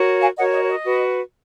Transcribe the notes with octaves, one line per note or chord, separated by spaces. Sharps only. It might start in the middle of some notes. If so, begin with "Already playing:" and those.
Already playing: F#4 A#4 C#5
F5 G#5
F#4 A#4 C#5 D#5 F#5
D#5
C#5
D#5
F#4 B4